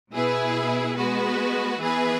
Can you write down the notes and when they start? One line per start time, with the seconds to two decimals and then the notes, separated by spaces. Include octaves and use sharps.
0.12 B2 B3 E4 G#4 B4
0.96 G#3 B3 F#4 B4
1.80 E3 B3 G#4 B4